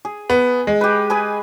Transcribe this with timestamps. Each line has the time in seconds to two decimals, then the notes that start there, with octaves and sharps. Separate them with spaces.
0.05 G#4
0.30 B3
0.67 G#3
0.81 G4 B4
1.10 G#4 B4 G#5